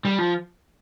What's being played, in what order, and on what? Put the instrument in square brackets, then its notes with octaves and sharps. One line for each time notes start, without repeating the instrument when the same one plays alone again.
[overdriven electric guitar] G3
F3